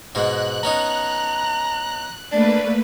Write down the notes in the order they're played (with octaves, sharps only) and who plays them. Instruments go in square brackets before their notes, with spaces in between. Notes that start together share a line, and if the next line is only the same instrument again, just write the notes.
[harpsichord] G#2 B2 G#3 [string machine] F#6
[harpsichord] B3 C#4 D#4 [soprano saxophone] A#5
[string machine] A3 A#3 B4 [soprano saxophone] D4 [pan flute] D5